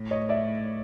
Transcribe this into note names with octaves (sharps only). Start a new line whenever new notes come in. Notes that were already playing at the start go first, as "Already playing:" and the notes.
Already playing: A2
C#5 D#5
D5 E5